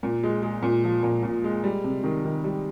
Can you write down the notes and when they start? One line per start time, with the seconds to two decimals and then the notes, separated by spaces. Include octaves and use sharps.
0.03 A#2
0.23 G#3
0.43 G#3
0.63 A#2
0.84 F3
1.03 A#2
1.23 A#2
1.44 G#3
1.64 G3
1.84 C3
2.04 D#3
2.25 D#3
2.44 G3